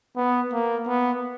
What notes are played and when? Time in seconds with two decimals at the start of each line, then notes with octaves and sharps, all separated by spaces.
0.17 B3
0.53 A#3
0.87 B3